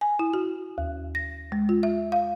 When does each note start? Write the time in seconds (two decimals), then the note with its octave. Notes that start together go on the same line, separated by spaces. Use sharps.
0.01 G#5
0.19 E4
0.33 F#4
0.78 D#2
1.15 A#6
1.52 G#3
1.69 F4
1.83 E5
2.12 F5